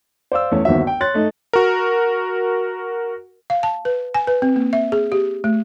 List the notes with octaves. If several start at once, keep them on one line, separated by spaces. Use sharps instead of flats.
C5 D5 F5 E6
E2 A3 C#4
G1 D#2 C4 F#4 E5
G5
C#5 C6 F#6 A6
A3 D#4 A4
F#4 A#4
F5
A5
B4
G#5
B4
C4
A#3
E5
G#4
G4
A3